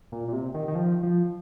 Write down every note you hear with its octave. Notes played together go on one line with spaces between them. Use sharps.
A#2
A#2
C3
D#3
D#3
F3
F3